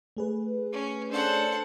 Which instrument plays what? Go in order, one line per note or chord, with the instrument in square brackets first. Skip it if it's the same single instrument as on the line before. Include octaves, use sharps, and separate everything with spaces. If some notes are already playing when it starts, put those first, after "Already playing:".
[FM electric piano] A3 G#4 B4
[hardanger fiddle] C#4
[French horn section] C#4 D4 [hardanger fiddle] A4 F#5 [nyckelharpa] C5